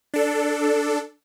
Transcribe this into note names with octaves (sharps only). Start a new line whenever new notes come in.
D4 A4